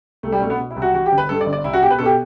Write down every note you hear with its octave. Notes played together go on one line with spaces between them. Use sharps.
C2 A3
G3
B2 A3
B3
B2
E4
C2
F#4
E3 F#4
G4
G1
B4
G2 A4
D5
G1
D5
C2 E4
F#4
B2 G4
B4
B2 A4
G4